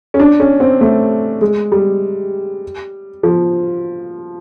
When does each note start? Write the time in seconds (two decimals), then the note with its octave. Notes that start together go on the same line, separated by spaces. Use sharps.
0.14 C#4
0.20 D4
0.40 C#4
0.60 C4
0.81 A3
1.41 G#3
1.72 G3
3.23 F3